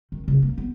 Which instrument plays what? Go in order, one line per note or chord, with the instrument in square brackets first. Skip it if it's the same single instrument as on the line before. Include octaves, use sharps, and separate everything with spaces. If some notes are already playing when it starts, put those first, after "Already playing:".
[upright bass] D#3
C#3
A#3
B3